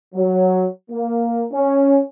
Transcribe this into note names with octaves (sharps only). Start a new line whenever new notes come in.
F#3
A#3
C#4